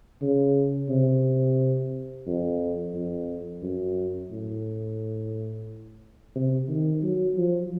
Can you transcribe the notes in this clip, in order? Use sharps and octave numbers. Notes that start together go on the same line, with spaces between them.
C#3
C3
F2
F2
F#2
A2
C3
D#3
F#3
F3